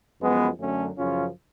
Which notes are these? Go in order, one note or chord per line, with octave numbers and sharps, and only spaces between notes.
F#2 F3 G#3 B3
F#2 D3 F#3 A3 C#4
F#2 C#3 F3 C#4 F4